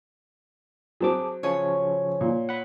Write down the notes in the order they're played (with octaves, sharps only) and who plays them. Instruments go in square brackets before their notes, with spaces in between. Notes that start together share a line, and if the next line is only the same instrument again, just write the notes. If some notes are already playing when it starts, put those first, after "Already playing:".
[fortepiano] F#3 C4 F#4 [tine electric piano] G#4 A5 D6
[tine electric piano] C#3 F3 G#5 [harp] C#5
[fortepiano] A#2
[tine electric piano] F#5 B5